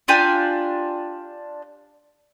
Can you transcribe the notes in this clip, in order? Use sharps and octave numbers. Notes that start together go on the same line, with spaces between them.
D4 F4 G4 G#5